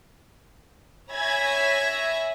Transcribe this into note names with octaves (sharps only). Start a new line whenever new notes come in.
C#5 E5 G#5 B5 G#6 A#6